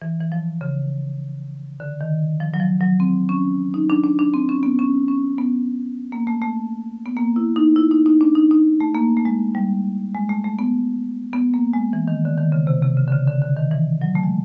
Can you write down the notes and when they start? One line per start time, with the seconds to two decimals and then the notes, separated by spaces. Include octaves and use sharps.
0.02 E3
0.21 E3
0.32 F3
0.61 C#3
1.80 D3
2.01 D#3
2.40 F3
2.54 F#3
2.60 F3
2.80 F#3
3.00 C4
3.29 C#4
3.74 D#4
3.90 D4
4.04 D4
4.19 D4
4.34 C4
4.49 C#4
4.63 B3
4.79 C#4
5.08 C#4
5.38 B3
6.12 A#3
6.27 A3
6.42 A3
7.06 B3
7.17 A#3
7.36 E4
7.56 D#4
7.76 E4
7.91 D#4
8.06 D#4
8.21 D4
8.35 D#4
8.51 D#4
8.80 A3
8.95 A#3
9.17 A3
9.25 G#3
9.55 G3
10.14 G#3
10.29 A3
10.44 A3
10.59 B3
11.33 B3
11.54 A#3
11.73 G#3
11.93 E3
12.08 D#3
12.25 D3
12.38 D#3
12.52 C#3
12.67 C3
12.82 C3
12.97 C#3
13.08 D3
13.12 C#3
13.27 D3
13.42 D3
13.57 D#3
13.71 E3
14.01 F#3
14.15 A3
14.23 G#3